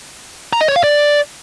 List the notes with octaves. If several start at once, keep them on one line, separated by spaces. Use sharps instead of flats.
A#5
D#5
C#5
F5
D5